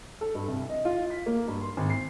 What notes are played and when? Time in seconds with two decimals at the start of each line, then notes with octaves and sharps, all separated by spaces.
0.21 A4
0.35 G2
0.48 C2
0.70 D#5
0.85 F4
1.10 B6
1.26 A#3
1.48 G2
1.61 C6
1.77 G#1
1.90 C7